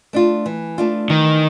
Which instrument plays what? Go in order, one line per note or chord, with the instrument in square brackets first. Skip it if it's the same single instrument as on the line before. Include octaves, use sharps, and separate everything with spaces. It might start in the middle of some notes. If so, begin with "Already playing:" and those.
[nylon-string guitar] A3 D4 F4
E3
A3 D4 F4
[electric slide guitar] D#3 [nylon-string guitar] E3